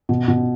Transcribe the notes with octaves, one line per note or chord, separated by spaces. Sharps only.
B2
B2